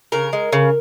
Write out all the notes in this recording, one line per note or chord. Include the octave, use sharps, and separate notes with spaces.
C#3 A#4
G#3
C#3